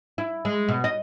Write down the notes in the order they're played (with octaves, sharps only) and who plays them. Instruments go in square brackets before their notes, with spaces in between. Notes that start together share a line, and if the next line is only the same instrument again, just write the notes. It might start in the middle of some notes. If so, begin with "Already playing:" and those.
[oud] E4
G#3
B2
D#5